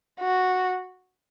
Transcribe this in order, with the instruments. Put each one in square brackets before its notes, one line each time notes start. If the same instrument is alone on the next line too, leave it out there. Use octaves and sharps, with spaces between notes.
[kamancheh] F#4